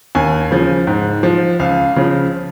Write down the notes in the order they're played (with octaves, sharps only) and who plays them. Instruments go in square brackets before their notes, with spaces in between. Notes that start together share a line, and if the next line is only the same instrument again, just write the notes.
[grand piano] D#2 G#5
C#3 F3
G#2
F3
C#2 F5
C#3 F3